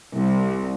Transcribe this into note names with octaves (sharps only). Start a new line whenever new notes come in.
C2